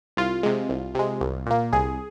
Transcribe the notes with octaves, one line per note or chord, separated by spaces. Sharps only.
C2 F4
C3 G#3
C2
C3 G#3
C2
A#2 A#3
C2 G#4